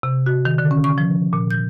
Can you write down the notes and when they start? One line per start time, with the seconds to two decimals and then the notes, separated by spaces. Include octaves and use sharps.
0.03 C3
0.26 F#4
0.45 D#3
0.58 D3
0.71 C#4
0.84 C#6
0.98 F3
1.33 A#2
1.51 G6